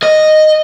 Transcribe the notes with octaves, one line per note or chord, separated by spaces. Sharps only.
D#5